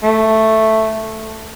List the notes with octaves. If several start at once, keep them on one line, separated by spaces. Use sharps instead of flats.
A3